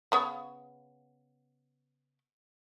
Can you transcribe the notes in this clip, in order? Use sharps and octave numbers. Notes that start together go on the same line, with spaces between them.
C#3 B3 C#5